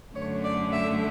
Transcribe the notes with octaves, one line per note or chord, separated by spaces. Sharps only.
F#2 D3 A3 C#5
D5
E5